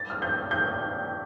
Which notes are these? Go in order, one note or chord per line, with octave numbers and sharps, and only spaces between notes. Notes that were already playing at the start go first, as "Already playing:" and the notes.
Already playing: A6
F6
G6
G6